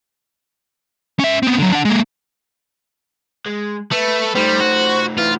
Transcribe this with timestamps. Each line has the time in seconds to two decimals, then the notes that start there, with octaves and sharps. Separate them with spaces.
1.19 C#4 E5
1.43 B3 C4
1.58 D3 F#3
1.72 D4 F#5
1.85 G#3 A#3
3.46 G#3
3.91 A3 B4
4.35 G3 A3 D#4 C5
4.60 F#4
5.18 E3 F4